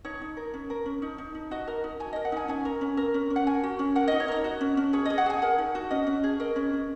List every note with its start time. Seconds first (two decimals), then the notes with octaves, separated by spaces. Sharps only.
0.05 D#4 C#5
0.21 D#4
0.37 A#4
0.54 C#4
0.70 A#4
0.86 C#4
1.02 D#4
1.18 D#4
1.35 D#4
1.51 F#4 D#5
1.67 A#4
1.84 D#4
2.00 F#4 G#5
2.13 A#4 D#5
2.25 F#5
2.32 D#4 G#5
2.48 C#4 G#5
2.65 A#4
2.81 C#4
2.97 A#4
3.14 C#4
3.30 C#4
3.36 F#5
3.47 A#4 G#5
3.63 F#4
3.79 C#4
3.95 A#4 F#5
4.08 D#5
4.12 D#4
4.20 C#5
4.28 A#4 D#5
4.44 F#4
4.61 C#4
4.77 C#4
4.93 G#4 C#5
5.05 D#5
5.10 G#4
5.18 F#5
5.26 G#4 G#5
5.42 A#4 F#5
5.58 D#4
5.75 F#4
5.90 C#4 D#5
6.07 C#4
6.24 G#4
6.40 A#4 D#5
6.56 C#4
6.73 C#4